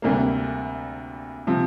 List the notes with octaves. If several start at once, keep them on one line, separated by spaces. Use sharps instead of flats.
D2 C3 G3 A#3
C3 F3